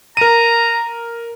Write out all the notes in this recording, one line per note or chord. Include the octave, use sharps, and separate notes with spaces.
A#4 A#5 D#7